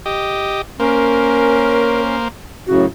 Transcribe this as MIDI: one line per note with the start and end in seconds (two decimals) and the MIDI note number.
0.06 0.62 67
0.06 0.62 75
0.80 2.28 58
0.80 2.16 61
0.80 2.01 70
0.80 2.28 72
2.67 2.86 42
2.67 2.86 45
2.67 2.86 49
2.67 2.85 66